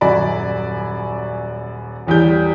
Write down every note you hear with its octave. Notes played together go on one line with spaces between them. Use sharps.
D#1 F#2 F#4 D5 G#5 B5
A1 E2 G3 G6